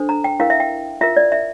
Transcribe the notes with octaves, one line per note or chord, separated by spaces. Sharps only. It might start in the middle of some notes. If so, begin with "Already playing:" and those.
Already playing: D4 A4 C5
A#5
G5
E4 A#4 F5
E5
G5
F4 A#4 E5
D5
E5